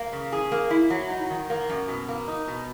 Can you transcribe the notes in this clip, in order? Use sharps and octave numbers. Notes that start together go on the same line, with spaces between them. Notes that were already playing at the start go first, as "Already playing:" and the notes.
Already playing: A#3
C#3
G#4
A#3
E4
F#3
D#4
D#3
A#3
F#2
B2
A#3
D#4
B2